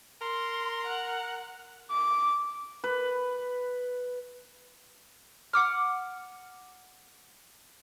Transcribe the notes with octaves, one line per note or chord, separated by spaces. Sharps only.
A#4 C6
F#5
D6
B4
F#5 D6 F6